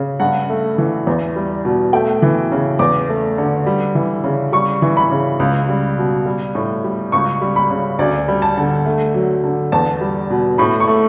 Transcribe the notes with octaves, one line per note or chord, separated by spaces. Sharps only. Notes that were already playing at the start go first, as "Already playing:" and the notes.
Already playing: C#3
G2 F#5
A3
E3
E2
G3
B2
A3 G5
E3
C#3
E2 D6
A3
D3
G3
E3
C#3
G3 C#6
E3
B5
C#3
C#2
G3
B2
G3
A2
G3
C#2 C#6
G3
B5
C#3
D2 D5
G3
A5
D3
A3
F#3
D3
E2 A5
G3
B2
A2 B5
C#6
A3